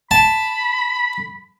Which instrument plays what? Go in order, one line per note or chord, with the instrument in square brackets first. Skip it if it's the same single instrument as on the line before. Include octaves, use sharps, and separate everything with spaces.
[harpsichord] A5 [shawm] B5